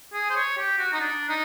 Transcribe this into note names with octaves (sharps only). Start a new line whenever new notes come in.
G#4
C5
C#5
G4
F#4
D#4
D4
D#4